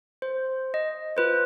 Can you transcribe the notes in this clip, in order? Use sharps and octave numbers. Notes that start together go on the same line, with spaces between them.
C5
D#5
F4 B4 C5